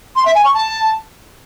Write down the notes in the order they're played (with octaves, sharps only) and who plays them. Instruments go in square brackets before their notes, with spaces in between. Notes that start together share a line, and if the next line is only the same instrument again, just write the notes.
[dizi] C6
E5
G#5
C#6
A5